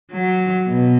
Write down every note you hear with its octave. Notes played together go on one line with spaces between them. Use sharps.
F#3
B2